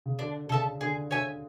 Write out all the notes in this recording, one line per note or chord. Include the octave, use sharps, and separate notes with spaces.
C#3
D3 D4
D3
C#3 A4 E5 A5
D3 G#4
D3 C#5 E5 G#5